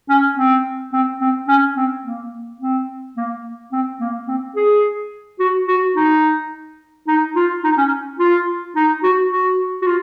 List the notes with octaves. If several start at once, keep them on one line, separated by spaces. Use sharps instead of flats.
C#4
C4
C4
C4
C#4
C4
A#3
C4
A#3
C4
A#3
C4
G#4
F#4
F#4
D#4
D#4
F4
D#4
C#4
F4
D#4
F#4
F#4
F#4
F4